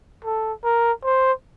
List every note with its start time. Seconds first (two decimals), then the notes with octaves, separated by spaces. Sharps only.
0.25 A4
0.64 A#4
1.04 C5